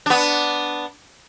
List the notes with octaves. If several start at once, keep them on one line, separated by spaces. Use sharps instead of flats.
B3 D4